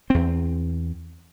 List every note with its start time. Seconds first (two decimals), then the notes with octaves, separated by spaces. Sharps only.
0.10 E2 C4